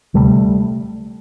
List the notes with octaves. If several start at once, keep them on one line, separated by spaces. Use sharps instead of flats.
D2 C3 G3 A3